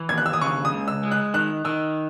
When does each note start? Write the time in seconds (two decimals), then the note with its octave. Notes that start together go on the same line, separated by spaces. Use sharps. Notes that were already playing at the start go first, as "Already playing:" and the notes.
Already playing: E3
0.09 D#2 G#6
0.18 F#6
0.26 E6
0.33 D#6
0.41 C#3 C#6
0.65 D#6
0.73 C#2
0.88 E6
1.03 G#3
1.11 F#6
1.34 D#3 F#6
1.65 D#3 E6